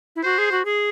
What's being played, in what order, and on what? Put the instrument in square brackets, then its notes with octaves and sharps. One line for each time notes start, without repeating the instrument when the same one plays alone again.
[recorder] E4
[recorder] F#4 [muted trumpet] C5
[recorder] G#4
F#4
G#4